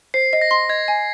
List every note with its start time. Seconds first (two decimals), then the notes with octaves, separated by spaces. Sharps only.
0.14 C5 C7
0.33 D#5
0.41 A#6
0.51 C6
0.69 D#5 G#6
0.88 G#5